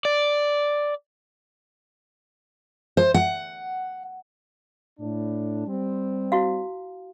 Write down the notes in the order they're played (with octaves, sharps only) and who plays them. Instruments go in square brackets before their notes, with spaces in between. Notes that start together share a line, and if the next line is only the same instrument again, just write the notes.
[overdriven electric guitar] D5
[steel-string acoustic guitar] C5
F#5
[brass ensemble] A2 D4
G3 C4
[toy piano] E4 F#4 F5